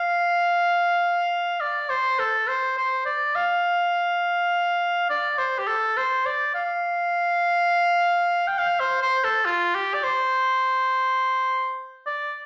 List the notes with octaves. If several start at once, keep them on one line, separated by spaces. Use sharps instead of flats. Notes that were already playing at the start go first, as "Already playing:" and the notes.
Already playing: F5
D5
C5
A4
C5
C5
D5
F5
D5
C5
G4
A4
C5
D5
F5
G5
F5
C5
C5
A4
F4
G4
D5
C5
D5